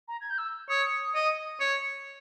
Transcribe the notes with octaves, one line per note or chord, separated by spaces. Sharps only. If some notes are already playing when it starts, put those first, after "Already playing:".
A#5
G#6
G6
E6
C#5 D#6
D#5
C#5